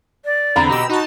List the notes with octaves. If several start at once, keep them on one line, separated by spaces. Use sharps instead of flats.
D5
E2 D3 C4 A#5 B5
B2 G4 D#5 E6
D#4 F#4 A5